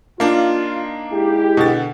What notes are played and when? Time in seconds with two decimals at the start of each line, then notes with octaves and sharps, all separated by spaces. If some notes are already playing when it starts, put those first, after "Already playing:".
0.20 A#3 D4 D#4 F4
1.12 G#3 E4 G4
1.57 B2 D3 A6